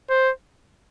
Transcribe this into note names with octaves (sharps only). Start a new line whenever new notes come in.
C5